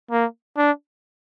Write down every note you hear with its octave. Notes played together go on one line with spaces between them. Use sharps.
A#3
D4